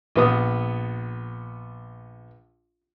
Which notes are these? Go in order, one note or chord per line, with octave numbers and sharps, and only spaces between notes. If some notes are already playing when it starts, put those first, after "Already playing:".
A#1 B3 D#6